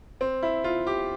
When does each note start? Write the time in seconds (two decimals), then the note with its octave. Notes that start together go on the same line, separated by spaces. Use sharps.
0.21 C4
0.43 E4
0.64 F4
0.87 G4